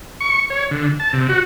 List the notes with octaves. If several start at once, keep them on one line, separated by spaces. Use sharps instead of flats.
C#6
C#5
D3
A5
C3
F#4